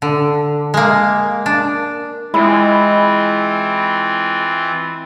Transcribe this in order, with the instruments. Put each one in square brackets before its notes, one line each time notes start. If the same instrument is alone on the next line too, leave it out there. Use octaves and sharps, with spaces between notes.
[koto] D3
G#3 A#3
D4
[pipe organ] E3 C4 F4 [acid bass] G#3 [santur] E4